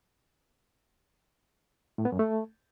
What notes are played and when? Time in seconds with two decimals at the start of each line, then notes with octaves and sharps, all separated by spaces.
1.98 A2
2.05 B3
2.12 F#2
2.19 A3